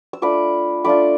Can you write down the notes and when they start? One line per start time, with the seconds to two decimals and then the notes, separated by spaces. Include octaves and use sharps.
0.13 E6
0.22 A3 D4 F4 B5 D6
0.84 A3 D4 F4 B5 D6